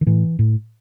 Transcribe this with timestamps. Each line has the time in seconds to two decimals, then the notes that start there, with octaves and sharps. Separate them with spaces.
0.01 D#3
0.06 A2 E3
0.39 A2